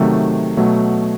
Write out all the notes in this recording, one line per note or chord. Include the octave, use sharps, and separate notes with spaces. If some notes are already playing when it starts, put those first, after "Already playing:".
Already playing: C3 D#3 F#3 A3
B2 F#3 A3